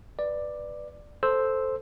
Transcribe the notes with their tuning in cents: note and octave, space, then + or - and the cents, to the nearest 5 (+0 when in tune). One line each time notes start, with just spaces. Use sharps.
B4 +0 D5 +10
A4 +0 C5 +0 E6 -5